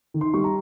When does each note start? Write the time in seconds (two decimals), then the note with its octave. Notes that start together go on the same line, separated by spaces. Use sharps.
0.14 D#3
0.21 C6
0.34 G3 C#6
0.44 A#5